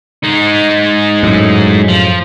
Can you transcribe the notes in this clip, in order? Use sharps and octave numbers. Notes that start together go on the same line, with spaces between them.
G#3 D#4
F#2 A2
F3